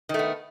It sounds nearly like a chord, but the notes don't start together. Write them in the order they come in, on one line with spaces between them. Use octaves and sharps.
D#3 A3 B3